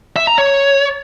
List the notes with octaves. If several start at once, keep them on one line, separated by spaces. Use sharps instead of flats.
E5
A#5
C#5